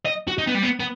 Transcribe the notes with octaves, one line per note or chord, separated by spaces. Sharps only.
D#5
F#4
D#4
B3
G3
B3
B3